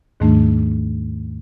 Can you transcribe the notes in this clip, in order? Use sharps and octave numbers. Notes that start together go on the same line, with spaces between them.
D#2 G#2 D#3 G3 A3 D4